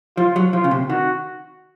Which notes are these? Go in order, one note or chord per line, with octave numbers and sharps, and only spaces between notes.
F3 F4
F#3
F3 F4
C#3
C3
D#3 F#4